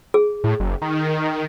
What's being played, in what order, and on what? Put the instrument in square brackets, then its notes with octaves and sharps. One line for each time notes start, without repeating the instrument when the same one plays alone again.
[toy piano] G#4
[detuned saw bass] A2
F#1
D#3